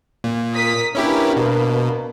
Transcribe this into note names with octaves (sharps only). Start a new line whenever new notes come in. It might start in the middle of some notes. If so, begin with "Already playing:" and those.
A#2
A#4 D#6 B6
A#3 C#4 D4 E4 G4 B4
B2